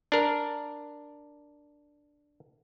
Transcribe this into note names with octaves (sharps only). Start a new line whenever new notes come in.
D4 A#4